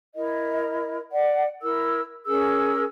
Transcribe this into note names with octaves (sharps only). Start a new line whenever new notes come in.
E4 A#4 D#5
D5 F#5
E4 A#4 E6
C#4 G#4 A#4 E6